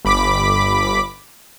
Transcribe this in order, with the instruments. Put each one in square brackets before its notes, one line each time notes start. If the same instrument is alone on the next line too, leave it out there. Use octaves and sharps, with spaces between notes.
[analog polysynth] G1 B5 D6 B6